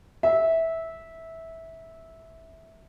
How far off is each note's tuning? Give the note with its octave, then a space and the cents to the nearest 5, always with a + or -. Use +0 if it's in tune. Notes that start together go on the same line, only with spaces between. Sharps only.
E5 -15